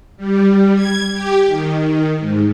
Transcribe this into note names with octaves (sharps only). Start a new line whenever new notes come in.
G3
G#6
G4
D#3
D#3
G#2